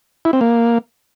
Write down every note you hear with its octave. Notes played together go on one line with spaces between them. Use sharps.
E4
C4
A#3